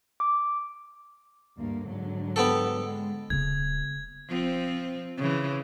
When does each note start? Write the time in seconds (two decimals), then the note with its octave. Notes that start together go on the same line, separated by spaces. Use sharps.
0.20 D6
1.57 D2 G2 A#3
1.86 G#2 D3 F#3
2.36 B3 G4 A4
2.82 G#3
3.30 D#1 C#3 B3 G#6
4.28 F3 C4
5.17 C#3 E3